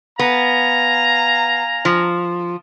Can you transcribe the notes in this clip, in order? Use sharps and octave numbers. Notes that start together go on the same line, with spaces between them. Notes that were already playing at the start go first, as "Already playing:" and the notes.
B3 F5 G#5 A#5
F3